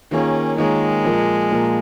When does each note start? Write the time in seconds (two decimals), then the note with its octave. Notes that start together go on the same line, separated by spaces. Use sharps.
0.11 D#3 A#3 C#4 F4 G#4 C#5
0.58 D#3 G#3 A#3 F4 G#4 C#5
1.05 A#2 F3 A#3 F4 A#4
1.51 A#2 F3 A#3 F4 A#4